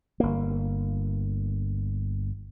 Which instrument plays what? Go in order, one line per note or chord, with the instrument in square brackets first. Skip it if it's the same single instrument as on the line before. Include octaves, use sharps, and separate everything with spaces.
[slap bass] G1 A#3